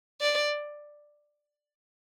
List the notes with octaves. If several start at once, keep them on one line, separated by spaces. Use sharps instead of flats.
D5